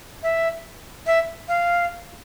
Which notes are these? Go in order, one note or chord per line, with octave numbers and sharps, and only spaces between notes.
E5
E5
F5